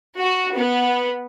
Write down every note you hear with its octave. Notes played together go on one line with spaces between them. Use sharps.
F#4
B3